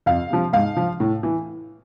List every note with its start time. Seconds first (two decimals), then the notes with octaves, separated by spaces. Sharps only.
0.06 F2 F5
0.30 C3 F3
0.53 G#2 F5
0.77 F3
1.00 A2
1.23 E3